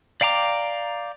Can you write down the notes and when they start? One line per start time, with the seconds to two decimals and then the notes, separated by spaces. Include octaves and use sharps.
0.21 D5 F5 G5 A#5 D6